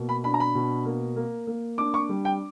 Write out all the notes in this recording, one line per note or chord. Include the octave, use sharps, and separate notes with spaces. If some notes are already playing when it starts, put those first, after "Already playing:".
Already playing: B2 A#3
B5
D4 B5
A#5
B5
B2
A#3
A#3
A#3
D4 D6
C#6
G3
G5